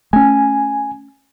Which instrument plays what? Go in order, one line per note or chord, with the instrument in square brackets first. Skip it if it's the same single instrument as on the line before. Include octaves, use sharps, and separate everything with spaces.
[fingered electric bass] A3 C#4 [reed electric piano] G#5